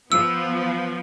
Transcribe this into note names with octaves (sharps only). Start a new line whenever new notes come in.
F3 B3 E6